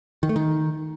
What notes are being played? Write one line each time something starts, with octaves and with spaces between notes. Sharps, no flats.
D#3
A3
D#3